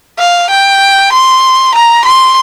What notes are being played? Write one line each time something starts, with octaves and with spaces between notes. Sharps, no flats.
F5
G5
C6
A#5
C6